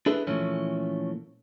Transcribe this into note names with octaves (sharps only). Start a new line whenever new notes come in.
D4 E4 G#4 A4 B4
A#2 E3 F3 A3 A#3 C#4